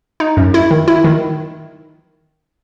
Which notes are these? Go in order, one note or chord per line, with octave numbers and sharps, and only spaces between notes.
D#4
F#2
E4
D#3
E4
D#3